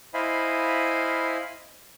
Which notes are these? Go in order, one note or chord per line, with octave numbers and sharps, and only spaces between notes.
E4 C5 D#5 F5 G#5 B5